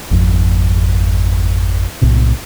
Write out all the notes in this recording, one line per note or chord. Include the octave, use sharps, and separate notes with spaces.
G#1 F2
B1 A2 C3